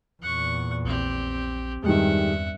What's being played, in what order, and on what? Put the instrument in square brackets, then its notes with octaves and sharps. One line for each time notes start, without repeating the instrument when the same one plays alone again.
[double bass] E2 A#2 [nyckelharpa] F#5 C#6
[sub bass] A#1 [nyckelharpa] C4 G4
[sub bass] E2 [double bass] G2 [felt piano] D#3 G3 G#3 [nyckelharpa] E5 F#5